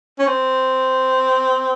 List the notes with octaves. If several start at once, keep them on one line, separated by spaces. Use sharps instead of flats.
C#4
C4